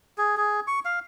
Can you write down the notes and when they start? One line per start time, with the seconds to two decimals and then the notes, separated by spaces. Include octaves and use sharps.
0.18 G#4
0.37 G#4
0.67 C#6
0.85 F5